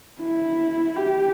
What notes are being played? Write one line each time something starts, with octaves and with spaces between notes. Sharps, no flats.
E4
G4